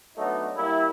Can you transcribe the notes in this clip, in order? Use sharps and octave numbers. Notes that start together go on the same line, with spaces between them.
F#3 A3 B3 D4 D#4
G3 A#3 E4